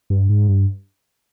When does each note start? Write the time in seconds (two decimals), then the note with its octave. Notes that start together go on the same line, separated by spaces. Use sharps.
0.10 G2
0.29 G#2
0.49 G2